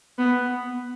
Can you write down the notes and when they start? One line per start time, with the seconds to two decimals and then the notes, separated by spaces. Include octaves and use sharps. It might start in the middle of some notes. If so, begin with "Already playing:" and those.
0.18 B3